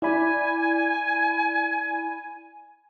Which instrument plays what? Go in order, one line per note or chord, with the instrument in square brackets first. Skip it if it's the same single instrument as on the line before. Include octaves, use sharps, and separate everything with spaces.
[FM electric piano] E4 D5 B5 [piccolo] G#5